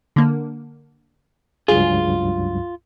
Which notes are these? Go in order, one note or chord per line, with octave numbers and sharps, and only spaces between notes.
D3 A#3
C#2 G2 F#3 F4 G#4